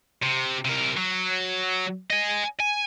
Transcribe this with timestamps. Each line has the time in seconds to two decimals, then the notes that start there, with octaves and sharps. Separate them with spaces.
0.23 C3
0.65 C3 A#4
0.97 F#3
2.10 D#5 G#5
2.60 G#5